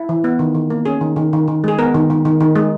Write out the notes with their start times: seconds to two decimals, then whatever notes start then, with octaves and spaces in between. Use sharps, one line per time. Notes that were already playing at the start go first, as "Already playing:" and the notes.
Already playing: E4
0.09 E3
0.24 B3
0.39 D#3
0.55 D#3
0.70 A#3
0.85 C#4 G#4
1.01 D#3
1.16 D#3
1.33 D#3
1.48 D#3
1.64 G#3 G#4
1.78 B3 A#4
1.94 D#3
2.10 D#3
2.25 D#3
2.41 D#3
2.56 G#3